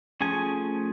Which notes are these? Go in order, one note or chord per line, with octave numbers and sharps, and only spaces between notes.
F3 A3 C#4 G#4 G#5